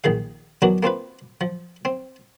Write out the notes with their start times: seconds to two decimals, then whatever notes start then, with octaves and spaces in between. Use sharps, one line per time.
0.04 A#1 D#3 G#4 F5
0.62 E3 F#3 B3 D4 F#4 A#4
0.83 A#3 C4 F4 B4
1.41 F3
1.85 C4